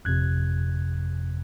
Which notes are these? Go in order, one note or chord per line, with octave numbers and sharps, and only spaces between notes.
G1 F2 C3 F#6 G#6